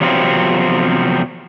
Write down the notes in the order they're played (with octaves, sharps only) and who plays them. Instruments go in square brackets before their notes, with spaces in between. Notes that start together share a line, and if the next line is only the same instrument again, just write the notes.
[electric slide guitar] E2 C3 F3 F#3 A3 C4